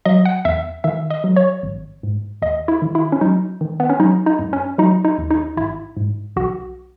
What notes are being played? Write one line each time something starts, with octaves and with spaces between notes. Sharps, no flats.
F#3 D#5
F#5
E2 E5
D#3 E5
D#5
F#3
C#5
G#1
G#2
D#2 D#5
E4
D#3
E4
C#4
F#3 D#4
D#3
B3
C#4
F#3 D#4
D#4
F#2
C#4
F#3 D#4
D#4
D#2
D#4
G#1 E4
G#2
B1 F#4